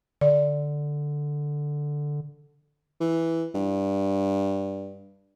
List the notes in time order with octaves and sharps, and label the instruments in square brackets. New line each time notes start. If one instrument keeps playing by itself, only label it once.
[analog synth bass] D3 [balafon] D5
[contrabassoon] E3
G2